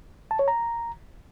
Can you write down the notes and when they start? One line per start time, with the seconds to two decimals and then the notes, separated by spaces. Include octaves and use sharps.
0.31 A5
0.39 C#5
0.48 A#5